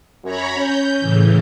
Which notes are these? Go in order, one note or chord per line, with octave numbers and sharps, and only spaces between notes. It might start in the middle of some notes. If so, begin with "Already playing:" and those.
F#2 C#5 A#5 B5
C#4 G6
A2 C#3 E3